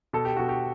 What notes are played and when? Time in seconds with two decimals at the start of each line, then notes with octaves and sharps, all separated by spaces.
0.13 B2 A4
0.25 G4
0.37 B2 F#4
0.49 G4